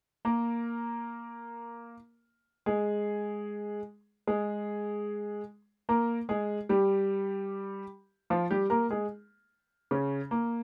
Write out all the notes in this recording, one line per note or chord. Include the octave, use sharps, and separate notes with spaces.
A#3 A#4
G#3 G#4
G#3 G#4
A#3 A#4
G#3 G#4
G3 G4
F3 F4
G3 G4
A#3 A#4
G#3 G#4
C#3 C#4
A#3